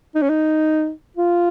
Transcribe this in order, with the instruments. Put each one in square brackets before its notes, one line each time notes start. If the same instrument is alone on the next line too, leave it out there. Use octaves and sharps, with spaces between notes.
[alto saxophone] D#4
C#4
D#4
F4